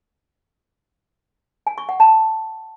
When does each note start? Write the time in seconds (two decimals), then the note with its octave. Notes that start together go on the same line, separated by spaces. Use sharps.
1.67 G#5
1.78 C#6
1.89 F#5
2.00 A5